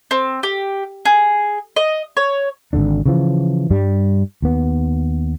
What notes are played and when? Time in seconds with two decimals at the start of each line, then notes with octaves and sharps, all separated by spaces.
0.11 C4
0.43 G4
1.05 G#4
1.76 D#5
2.17 C#5
2.73 G#1 C#2 D3 D4
3.06 C#3 E3 F3
3.70 G2 G3
4.42 D#2 B3